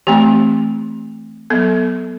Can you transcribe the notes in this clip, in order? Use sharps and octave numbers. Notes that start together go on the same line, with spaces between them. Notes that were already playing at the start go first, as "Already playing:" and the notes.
E3 A3 C4 G4
F#3 B3 A4